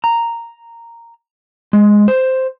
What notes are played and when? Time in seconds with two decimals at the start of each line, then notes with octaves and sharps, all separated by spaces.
0.04 A#5
1.73 G#3
2.08 C5